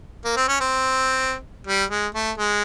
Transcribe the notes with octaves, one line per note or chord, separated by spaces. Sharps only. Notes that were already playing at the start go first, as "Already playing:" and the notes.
A#3
C4
C#4
C4
G3
G#3
A3
G#3